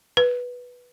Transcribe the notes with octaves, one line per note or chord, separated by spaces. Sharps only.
B4